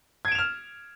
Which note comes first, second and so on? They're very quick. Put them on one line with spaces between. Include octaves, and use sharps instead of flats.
G#6 D7 E7 F7 F6